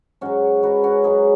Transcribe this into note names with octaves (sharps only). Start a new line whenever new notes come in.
G#2 F#3 C#4 F#4
G#2 F#3 F#4 B4
C#4 F#4
G#2 F#3 D#4 G#4